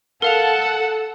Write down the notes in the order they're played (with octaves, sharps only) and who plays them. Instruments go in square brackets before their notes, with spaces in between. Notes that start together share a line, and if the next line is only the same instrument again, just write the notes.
[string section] A4 [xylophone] A#4 F5 F7 [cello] F#5